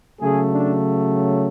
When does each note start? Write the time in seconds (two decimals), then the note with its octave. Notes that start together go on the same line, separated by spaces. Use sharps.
0.19 C#3 F#3 A3 G#4
0.50 D4